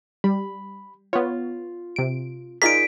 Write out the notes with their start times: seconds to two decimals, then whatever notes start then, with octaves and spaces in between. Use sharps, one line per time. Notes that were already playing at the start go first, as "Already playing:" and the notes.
0.24 G3 B5
1.13 B3 F4 C#5
1.96 C3 D7
2.62 D#4 F4 G#4 A#4 D5 B6 D7